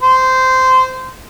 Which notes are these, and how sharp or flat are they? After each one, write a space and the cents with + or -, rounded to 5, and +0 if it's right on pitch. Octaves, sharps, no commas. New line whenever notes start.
C5 -15